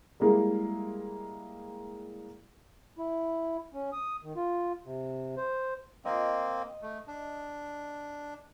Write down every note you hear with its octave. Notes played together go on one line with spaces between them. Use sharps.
G3 G#3 A#3 E4
E4
C#4
D#6
D#3
F4
C3
C5
A#3 C4 D#5
A3
D4